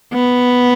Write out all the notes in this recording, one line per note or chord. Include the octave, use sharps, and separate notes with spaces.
B3